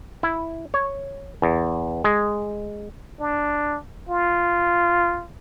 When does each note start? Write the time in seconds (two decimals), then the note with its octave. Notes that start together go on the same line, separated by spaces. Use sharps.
0.23 E4
0.74 C#5
1.42 E2
2.04 G#3
3.20 D4
4.09 F4